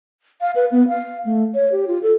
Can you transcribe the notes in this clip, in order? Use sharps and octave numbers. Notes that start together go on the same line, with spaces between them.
F5
B4
B3
F5
A3
C#5
G4
F4
A4